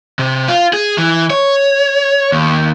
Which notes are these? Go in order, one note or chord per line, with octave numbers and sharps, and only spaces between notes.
C3
F4
G#4
E3
C#5
D#2